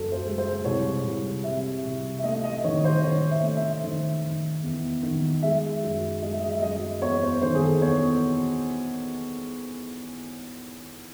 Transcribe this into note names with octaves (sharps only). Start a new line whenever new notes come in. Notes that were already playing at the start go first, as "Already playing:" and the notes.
Already playing: F#2 C#3 A4
C5
G#3
C5
C2 C#5
C2
C3 E5
C2
E5
A3 D#5
D#5
D#3 C#5
C5
D#3 C#5
E5
A3
E5
D#3
D#3
E2
D#3
G#3 E5
F#2
G#3 D#5
E5
D#5
E5
F#2 D#5
E2 C#5
C5
D#3 C5
G#4
A4
E2 C#5